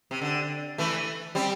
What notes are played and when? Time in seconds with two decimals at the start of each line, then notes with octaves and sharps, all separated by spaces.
0.11 C3
0.21 D3
0.78 E3 A3
1.35 G3 C4